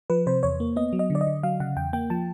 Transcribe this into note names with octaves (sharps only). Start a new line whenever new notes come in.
F3 B4
C3 C5
E2 C#5
A#3
B3 D#5
F#3
D#5
D3
D5
D#5
D3
F#3 F5
C#3 F#5
E2 G5
A#3 G5
F3 A5